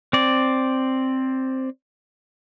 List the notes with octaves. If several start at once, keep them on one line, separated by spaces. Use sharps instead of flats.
C4 D5